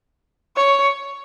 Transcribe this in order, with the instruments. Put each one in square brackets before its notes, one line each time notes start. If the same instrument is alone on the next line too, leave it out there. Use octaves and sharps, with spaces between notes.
[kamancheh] C#5